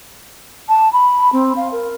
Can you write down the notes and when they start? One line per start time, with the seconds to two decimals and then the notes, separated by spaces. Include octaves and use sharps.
0.69 A5
0.93 B5
1.33 C4
1.56 F5
1.72 A#4